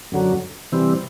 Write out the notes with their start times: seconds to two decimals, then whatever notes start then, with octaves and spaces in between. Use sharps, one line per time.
0.12 F#2 D3 F#3
0.72 C3 E3 G3 C4